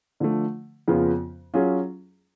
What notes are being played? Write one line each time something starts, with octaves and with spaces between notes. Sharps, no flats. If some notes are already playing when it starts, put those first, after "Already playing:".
D3 F3 A3
F2 C#3 F3 B3 F4
F#3 C#4 F4 G#4